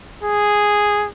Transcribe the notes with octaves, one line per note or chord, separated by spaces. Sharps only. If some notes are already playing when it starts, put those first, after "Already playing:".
G#4